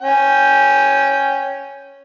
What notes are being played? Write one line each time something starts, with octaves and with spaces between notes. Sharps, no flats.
C#4 G5